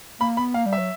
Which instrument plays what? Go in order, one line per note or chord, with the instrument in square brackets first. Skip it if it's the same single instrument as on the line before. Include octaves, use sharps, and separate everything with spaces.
[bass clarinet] A#3 [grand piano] B5
[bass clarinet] B3 [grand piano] B5
[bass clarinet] A#3 [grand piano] F5
[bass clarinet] G3
[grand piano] E5
[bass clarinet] F#3